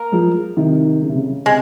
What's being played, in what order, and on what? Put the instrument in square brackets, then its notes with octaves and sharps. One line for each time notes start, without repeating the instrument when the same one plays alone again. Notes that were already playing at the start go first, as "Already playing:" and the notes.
Already playing: [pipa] A#3 A#4
[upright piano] F3 G#3
C3 D#3
C#3
C3
C#3
[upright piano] C3 [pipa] G#3